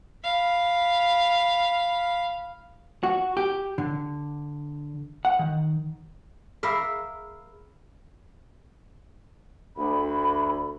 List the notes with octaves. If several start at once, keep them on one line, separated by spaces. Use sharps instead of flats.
F5 B5
F#4
G4
D3
F#5
D#3
G#4 A#4 E5 F5 B5 E6
D2 B5